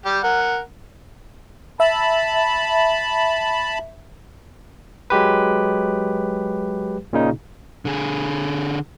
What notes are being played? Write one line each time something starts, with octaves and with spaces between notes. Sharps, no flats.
G3 G4
A#4 F#5
E5 A5 B5
F#3 G#3 G4 B4
A#2 C#3 D#4
D3 G#4